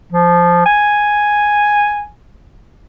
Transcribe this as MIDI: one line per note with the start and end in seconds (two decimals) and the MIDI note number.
0.12 0.61 53
0.66 2.07 80